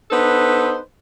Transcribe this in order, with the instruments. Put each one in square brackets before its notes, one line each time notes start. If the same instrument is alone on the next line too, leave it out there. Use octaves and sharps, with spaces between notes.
[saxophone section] B3 D4 D#4 A4 B4 C5